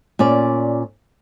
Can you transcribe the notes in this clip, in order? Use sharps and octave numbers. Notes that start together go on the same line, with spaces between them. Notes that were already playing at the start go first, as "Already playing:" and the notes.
A#2 C#4 D5